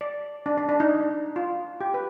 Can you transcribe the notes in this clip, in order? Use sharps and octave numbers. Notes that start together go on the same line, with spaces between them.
D5
D4
D4
D4
D#4
F4
G4
B4